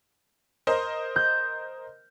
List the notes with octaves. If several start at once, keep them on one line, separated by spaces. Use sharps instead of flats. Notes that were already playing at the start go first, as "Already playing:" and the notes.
A#4 C5 D#5
G6